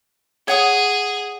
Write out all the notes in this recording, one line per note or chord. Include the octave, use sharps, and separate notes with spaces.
G#4 C#5 F#5 D#6